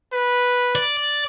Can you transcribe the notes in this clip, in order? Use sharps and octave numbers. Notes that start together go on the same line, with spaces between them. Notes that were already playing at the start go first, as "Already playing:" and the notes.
B4
D5